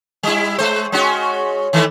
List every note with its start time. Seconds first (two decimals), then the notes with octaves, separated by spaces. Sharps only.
0.23 G3 E4
0.58 G#3 C5
0.92 G#3 C#4 F#4
1.73 D#3 E3 A3